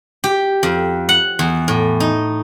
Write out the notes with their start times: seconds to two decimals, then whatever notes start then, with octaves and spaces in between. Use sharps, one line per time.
0.24 G4
0.63 F2
1.09 F#5
1.39 E2
1.68 A2
2.00 D#4